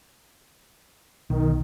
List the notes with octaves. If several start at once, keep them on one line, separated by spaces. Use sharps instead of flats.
B1 D#3